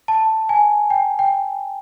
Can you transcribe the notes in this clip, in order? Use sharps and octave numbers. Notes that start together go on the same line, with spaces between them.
A5
G#5
G5
G5